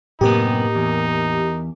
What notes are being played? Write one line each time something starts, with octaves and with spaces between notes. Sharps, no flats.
F#2 A2 C3 A#3 B3 D#4 G4 A#4
E2